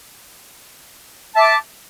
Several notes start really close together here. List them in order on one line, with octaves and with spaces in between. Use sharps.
A5 E5 D6